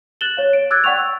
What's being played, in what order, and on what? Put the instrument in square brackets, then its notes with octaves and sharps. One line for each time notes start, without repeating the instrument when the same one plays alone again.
[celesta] F#6 A6 E7 F#7 G7
C#5 F5
D7
D6 E6 F#6 G#6 A6
D5 F#5 G5 C#6 F7
E6